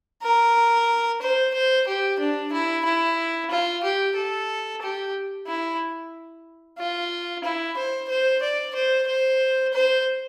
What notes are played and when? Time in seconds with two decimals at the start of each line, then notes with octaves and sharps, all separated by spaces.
0.23 A#4
1.22 C5
1.54 C5
1.88 G4
2.20 D4
2.53 E4
2.85 E4
3.51 F4
3.84 G4
4.16 A4
4.82 G4
5.47 E4
6.79 F4
7.44 E4
7.77 C5
8.09 C5
8.43 D5
8.75 C5
9.08 C5
9.74 C5